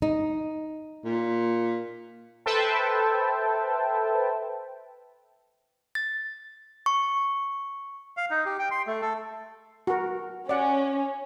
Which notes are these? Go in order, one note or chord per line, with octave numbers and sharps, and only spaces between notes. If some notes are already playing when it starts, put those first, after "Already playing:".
D#4
A#2
A4 B4 C5 E5 G5 A5
A6
C#6
F5
D#4
G4
G5
C6
A3
A4
F#4 A#4
C#4 D5 F#5